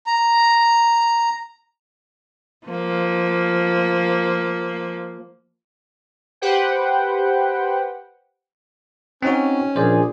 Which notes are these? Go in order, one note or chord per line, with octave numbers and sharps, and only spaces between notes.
A#5
F3 A#3
G4 B4 C5 F#5 G5
C4 C#4 D#4 F#4
A#1 G#4 C5 D5